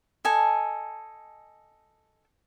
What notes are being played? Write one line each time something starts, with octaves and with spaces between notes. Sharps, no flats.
A4 D#5 G#5